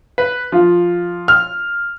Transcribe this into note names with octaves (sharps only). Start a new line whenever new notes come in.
B4
F3
F6